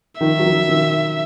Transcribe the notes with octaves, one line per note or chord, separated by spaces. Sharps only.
D#3 F3 E5
F#3
D#3 F3
D#3 F3